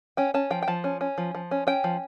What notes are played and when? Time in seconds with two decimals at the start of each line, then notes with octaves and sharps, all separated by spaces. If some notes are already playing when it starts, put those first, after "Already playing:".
0.17 C#4 G5
0.34 C#4 A5
0.51 F3 G5
0.62 G5
0.68 F3 A5
0.84 C#4
1.01 C#4
1.18 F3
1.35 F3
1.51 C#4
1.67 C#4 G5
1.84 F3